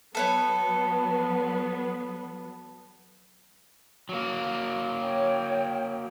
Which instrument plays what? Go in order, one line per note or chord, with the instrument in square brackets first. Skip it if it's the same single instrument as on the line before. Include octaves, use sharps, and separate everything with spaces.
[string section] F#3 B3 [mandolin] A4 B4 C#5
[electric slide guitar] F#3 A#3
[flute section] C#5 G5